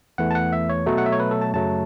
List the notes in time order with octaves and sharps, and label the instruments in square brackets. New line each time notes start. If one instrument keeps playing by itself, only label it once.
[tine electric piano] E2 E3 A3 F#5
A5
F#5
E5
C#5
B2 F#3 A3
F#5
E5
C#5
B4
A4
A5
F#2 C#3 F#3 A3 A5